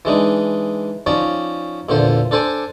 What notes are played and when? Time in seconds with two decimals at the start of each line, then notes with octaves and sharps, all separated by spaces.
0.05 E3 G#3 D4 D#4
1.06 F3 C#4 D#4 D5 A#5
1.89 E2 A#2 D3 C5
2.31 D4 A4 C5 G#5 D6